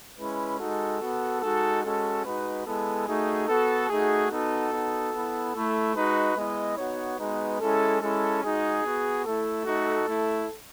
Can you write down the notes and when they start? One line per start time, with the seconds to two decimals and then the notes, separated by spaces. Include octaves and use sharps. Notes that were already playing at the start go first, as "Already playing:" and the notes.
0.18 G#3 C#4 E4 B4
0.60 G#3 D#4 F#4 A4
1.00 B3 F#4
1.41 G#3 D#4 F#4 A4
1.83 G#3 C#4 F#4 A4
2.24 G#3 D#4 F#4 B4
2.65 G#3 B3 E4 A4
3.06 A3 D#4 F#4 G#4
3.47 B3 F#4 A4
3.89 A3 D#4 F#4 G#4
4.30 B3 D#4 F#4 A4
4.72 B3 D#4 F#4
5.12 B3 E4
5.54 A3 E4
5.95 G#3 D#4 F#4 B4
6.36 G#3 B3 E4 D#5
6.77 B3 D#4 F#4 C#5
7.19 G#3 B3 D#4 F#4 B4
7.59 G#3 C#4 E4 A4
8.01 G#3 C#4 E4 A4
8.42 G#3 D#4 F#4 G#4
8.83 B3 F#4
9.25 A3 E4 A4
9.65 A3 D#4 F#4
10.07 A3 E4